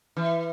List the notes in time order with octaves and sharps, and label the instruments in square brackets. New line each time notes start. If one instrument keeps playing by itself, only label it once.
[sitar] E3